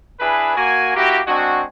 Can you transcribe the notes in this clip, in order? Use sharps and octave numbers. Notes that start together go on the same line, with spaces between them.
D4 E4 G#4 B4
A#3 F#4 G#5
A#3 E4 F#4 G4
G#3 C4 D4 F#4